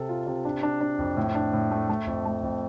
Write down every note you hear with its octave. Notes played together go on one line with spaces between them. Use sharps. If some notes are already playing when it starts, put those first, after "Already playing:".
Already playing: C3 A4
F4
C3
D4
D4
D4
F2
A2
D4
A2
A3
A3
F2
A3
F2